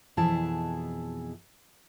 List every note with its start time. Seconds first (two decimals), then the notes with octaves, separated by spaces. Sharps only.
0.17 F2 B2 E3 E4 G#4 A5